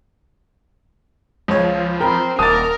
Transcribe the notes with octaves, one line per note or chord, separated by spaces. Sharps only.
C#2 F3 C#5
C4 A#4 G5 B5
D#1 A#4 A5 D6 D#6 A6